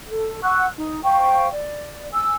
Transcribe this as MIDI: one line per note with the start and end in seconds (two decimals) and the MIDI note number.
0.08 0.41 69
0.43 0.67 78
0.43 0.67 85
0.43 0.67 88
0.43 0.67 90
0.76 1.02 63
1.03 1.48 72
1.03 1.48 77
1.03 1.48 79
1.03 1.48 85
1.52 2.07 74
2.12 2.36 80
2.12 2.36 88